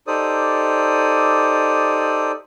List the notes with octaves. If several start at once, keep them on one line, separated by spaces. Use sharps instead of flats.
D#4 G4 A4 C5 D5 D#6